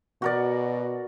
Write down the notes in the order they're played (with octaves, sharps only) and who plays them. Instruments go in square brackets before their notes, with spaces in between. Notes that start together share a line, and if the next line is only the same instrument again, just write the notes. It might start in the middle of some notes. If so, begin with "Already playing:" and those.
[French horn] B2 [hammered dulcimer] F#4 A#4 D5